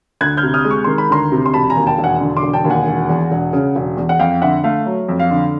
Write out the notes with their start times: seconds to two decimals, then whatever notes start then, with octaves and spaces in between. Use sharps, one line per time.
0.21 D2 F#6 G#6
0.37 F6 G6
0.43 C3
0.54 D#6 F6
0.65 G#3
0.71 C#6
0.84 D#3 C6
0.98 B5
1.10 D2 A#5 C6
1.32 C3
1.46 C6
1.53 E1 A5 B5
1.70 G#5 A#5
1.76 D#2
1.87 G5 A5
1.98 E1
2.04 F#5 G#5
2.20 D3
2.37 C6 D6
2.43 E1
2.53 G5 A5
2.64 D#2
2.70 F#5 G#5
2.87 E1
3.09 E2
3.31 E1
3.53 C#3
3.75 E1
3.97 E2
4.09 F#5
4.19 F2 F5 G5
4.42 D3 E5 F#5
4.64 A3 F5
4.86 F#3
5.09 F2
5.19 F5
5.31 D3